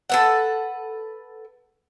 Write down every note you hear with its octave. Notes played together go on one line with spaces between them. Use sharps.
A4 B4 F#5